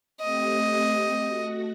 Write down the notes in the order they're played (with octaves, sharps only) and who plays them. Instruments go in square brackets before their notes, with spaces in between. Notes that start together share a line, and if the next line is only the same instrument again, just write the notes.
[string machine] A3 C4 G4 [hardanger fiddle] D#5
[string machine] A3 F#4 A#6